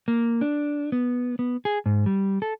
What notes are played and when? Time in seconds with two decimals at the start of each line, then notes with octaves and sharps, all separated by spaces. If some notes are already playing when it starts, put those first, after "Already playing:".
0.08 A#3
0.41 D4
0.92 B3
1.39 B3
1.65 G#4
1.86 G#2
2.06 G3
2.42 A4